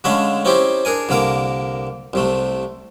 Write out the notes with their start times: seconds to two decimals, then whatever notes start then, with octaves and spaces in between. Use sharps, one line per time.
0.04 D3 G#3 A3 C#4 E5 F5
0.45 C4 C#4 D#4 E4 G4 C5
0.85 D4 G#4 A#4 G#5
1.09 C2 D3 A#3 A#4 D6
2.13 C2 C3 A3